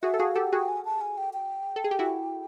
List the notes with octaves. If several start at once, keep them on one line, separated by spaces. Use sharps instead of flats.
F#4 G#4 E5
A4
F#4 G#4 F5
G4 A4 F#5
F#4 G#4 G5
G#5
A5
G#5
G5
G5
A4
G#4
G4
E4 F#4